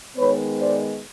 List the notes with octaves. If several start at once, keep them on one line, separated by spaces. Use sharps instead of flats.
D#3 G#3 B3 B4 C#5
C5 D5